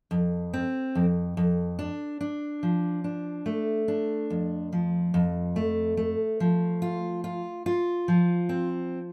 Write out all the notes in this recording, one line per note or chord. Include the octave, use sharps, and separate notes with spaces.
F2
C4
F2
F2
D4
D4
F3
D4
A3
D4
F2
F3
F2
A3
A3
F3
F4
F4
F4
F3
C4